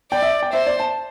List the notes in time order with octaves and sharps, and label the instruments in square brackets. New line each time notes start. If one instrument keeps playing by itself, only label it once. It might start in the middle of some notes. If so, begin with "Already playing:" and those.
[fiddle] D5 [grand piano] G5
[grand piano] E5
G5
[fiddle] C5 [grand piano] E5
[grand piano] D5
A5